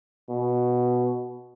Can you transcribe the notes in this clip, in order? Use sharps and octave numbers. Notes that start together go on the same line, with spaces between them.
B2